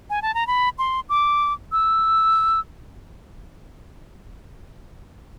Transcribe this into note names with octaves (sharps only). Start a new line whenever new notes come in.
G#5
A5
A#5
B5
C6
D6
E6